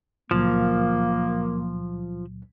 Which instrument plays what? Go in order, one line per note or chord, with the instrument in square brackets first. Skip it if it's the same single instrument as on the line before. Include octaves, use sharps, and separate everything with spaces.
[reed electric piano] C#2 A#2 F#3 [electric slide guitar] F3 [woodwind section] A#3